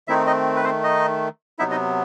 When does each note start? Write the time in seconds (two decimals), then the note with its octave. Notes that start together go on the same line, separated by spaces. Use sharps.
0.08 D#3 A3 C4 D#4 E4 E5
0.27 D#4 D#5
0.56 B4
0.64 C4 C5
0.84 D#4 D#5
1.59 C3 F#3 B3 D#4 E4 E5
1.71 D#4 D#5